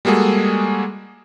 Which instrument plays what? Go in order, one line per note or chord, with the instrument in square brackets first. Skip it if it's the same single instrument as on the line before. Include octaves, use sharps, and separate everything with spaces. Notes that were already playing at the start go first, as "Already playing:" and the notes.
[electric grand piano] G3 G#3 A#3 F#4 G#4 A4